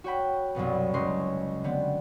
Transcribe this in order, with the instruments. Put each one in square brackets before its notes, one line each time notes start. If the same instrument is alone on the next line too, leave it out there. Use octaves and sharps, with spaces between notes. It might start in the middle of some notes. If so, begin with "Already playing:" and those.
[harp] F#4 C#5 G5 B5
C2 F#2 B2 B3
F#1 C#2 G#3 C#4 C6
D3 B3 C4